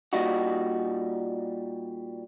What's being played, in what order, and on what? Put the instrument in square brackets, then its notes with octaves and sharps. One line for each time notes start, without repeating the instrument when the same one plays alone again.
[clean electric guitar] A#2 G3 D#4 F#4